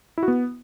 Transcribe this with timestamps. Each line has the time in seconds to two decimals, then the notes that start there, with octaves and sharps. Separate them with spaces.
0.18 E4
0.23 F#4
0.28 B3